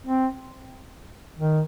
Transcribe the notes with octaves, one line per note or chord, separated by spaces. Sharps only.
C4
D#3